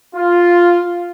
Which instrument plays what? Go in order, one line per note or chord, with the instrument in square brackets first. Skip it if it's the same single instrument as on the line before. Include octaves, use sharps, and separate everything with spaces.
[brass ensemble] F4